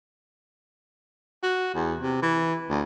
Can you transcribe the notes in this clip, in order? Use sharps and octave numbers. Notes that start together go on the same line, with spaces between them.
F#4
E2
C3
E3
D2